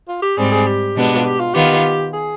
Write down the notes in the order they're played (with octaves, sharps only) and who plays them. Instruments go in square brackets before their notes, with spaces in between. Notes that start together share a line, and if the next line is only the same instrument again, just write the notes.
[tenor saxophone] F4
G4
[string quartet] G#2 G3 C4 [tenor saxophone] G#4
[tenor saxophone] G#4
G4
[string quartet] B2 G#3 B3 D4
[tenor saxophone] F4
G4
F4
[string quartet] D#3 B3 F4 [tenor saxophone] G4
[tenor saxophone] G#4